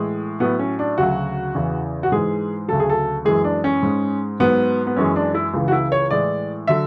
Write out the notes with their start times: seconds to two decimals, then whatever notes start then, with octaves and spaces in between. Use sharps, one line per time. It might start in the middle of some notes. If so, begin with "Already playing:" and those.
Already playing: A2 E3 G#3
0.40 A2 F#3 B3
0.59 C#4
0.79 D4
0.98 D2 C#3 F#3 F#4
1.55 E2 C#3 E3
2.03 F#4
2.12 G#2 E3 G#3 G#4
2.68 D2 C#3 F#3 A4
2.80 G#4
2.89 A4
3.25 F#2 E3 G#3 G#4
3.44 D4
3.64 C#4
3.83 G#2 G#3
4.40 G#2 F#3 B3
4.87 B3
4.97 F#2 E3 G#3 C#4
5.16 D4
5.34 E4
5.54 C#2 C#3 E3
5.68 F#4
5.72 E4
5.92 C#5
6.11 A2 E3 G#3 D5
6.68 D3 F#3 E5